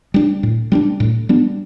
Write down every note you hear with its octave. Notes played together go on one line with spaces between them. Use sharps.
G3 D4
A2
G3 B3 D4
A2
G3 B3 D4